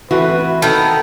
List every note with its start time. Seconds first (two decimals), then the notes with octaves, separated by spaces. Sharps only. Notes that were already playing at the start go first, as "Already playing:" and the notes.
0.11 E3 A3 C4 F#4 B4
0.62 D#3 B3 A4